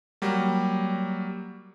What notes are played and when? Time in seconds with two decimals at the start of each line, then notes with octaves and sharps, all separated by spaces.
0.22 F#3 G3 A#3